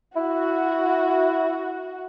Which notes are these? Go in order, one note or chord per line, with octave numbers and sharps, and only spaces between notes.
E4 F#4